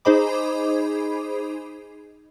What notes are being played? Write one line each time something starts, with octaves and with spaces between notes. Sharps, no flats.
D#4 G#4 C5 D#5 B5 D6